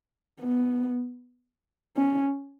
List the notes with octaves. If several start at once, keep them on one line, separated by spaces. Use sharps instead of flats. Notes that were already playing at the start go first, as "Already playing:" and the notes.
B3
C#4